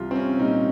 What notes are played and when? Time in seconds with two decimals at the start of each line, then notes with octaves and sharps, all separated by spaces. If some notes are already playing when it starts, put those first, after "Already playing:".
Already playing: C2 F4
0.11 C4
0.16 C#4
0.39 A#2 G3 D#4